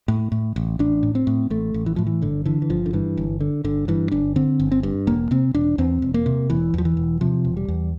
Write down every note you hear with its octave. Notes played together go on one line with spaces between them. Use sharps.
A2
A2
A1
A1 D4
A2
C4
A2
A1 A3
A1
E3
A2 F3
E3
G1 D3
D3 E3
E3
G1 F3
D3
G2 E3
G1
D3
G1 D3
G2 E3
G1 D4
D3 C4
G1
C4
G2
E1 A#3
C3 C4
E1 D4
E2 C4
E1
A#3
C3
E1 E3
E2 F3
E3
E1
C3 F3
E1
G3
E2